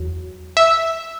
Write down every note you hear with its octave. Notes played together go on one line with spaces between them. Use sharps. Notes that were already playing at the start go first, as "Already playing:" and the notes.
Already playing: E2 F#3
E5